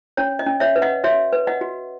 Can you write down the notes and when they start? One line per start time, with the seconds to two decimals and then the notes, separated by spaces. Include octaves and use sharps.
0.17 C#4 C#5
0.39 D#5
0.46 C#4
0.60 C#5 E5
0.76 B4
0.82 D#5 F#5
1.04 F#4 C#5 E5
1.32 B4
1.47 D#5 F#5
1.61 F#4